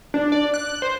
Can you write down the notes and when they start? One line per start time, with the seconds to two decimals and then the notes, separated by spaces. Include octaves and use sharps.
0.14 D4
0.32 D5
0.54 F#6
0.82 C5